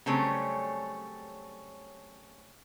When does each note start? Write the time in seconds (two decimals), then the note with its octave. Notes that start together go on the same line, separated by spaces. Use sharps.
0.06 C#3 F#3 G3 A3 C4 C#4